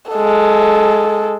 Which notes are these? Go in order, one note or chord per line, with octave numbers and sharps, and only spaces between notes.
G#3 A4